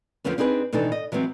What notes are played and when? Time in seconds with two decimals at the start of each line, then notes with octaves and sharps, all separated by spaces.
0.24 D#2 D3 F3 B3 C#4
0.38 C4 D4 D#4 G#4 B4
0.73 B2 D#3 E3 D4 D#4 A4
0.92 D#5
1.12 E3 F#3 G#3 B3 C4